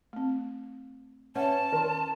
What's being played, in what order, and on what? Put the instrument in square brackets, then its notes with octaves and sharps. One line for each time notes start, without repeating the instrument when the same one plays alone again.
[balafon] A3 C4
[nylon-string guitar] C#4 [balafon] B4 E5 F#5 [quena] A5
[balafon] D#3 C6 [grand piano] A#4